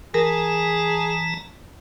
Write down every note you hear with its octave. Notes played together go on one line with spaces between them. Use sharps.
E3 G#4 A#4 A5 A#5